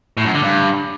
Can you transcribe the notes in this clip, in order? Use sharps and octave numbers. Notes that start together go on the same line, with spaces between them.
A2
F#2
D3
G2